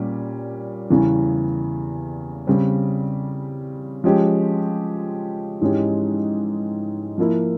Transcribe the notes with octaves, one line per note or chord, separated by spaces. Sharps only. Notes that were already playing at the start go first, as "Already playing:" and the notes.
Already playing: A#2 G3 C#4
E2 C#3 E3 G3
C#3 G3 C4
F3 G#3 C#4 G4
G#2 E3 G#3 C#4 G4
F3 A#3 E4